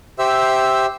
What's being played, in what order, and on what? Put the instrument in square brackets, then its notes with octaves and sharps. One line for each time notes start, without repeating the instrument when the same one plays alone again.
[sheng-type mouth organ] G4 C5 E5 E6